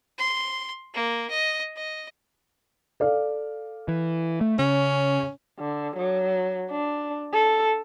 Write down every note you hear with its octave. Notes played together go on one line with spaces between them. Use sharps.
C6
A#3
D#5
D#5
A4 D5 F5
E3
A3
C#3 C#4
D3
F#3
D4
A4